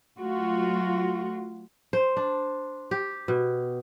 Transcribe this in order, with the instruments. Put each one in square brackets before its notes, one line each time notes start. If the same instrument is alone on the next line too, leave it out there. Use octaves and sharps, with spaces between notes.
[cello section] F#3 A3 F4 F#4
[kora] C5
D4
G4
B2